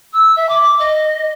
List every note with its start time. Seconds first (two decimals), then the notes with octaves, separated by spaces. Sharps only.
0.13 E6
0.35 E5
0.49 D6
0.79 D#5